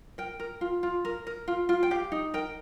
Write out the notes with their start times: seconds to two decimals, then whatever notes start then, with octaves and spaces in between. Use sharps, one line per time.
0.18 A#4 G5
0.40 A#4
0.61 F4
0.83 F4
1.05 A#4
1.27 A#4
1.48 F4
1.69 F4
1.83 G5
1.91 G4 F5
2.12 D#4
2.34 A#4 G5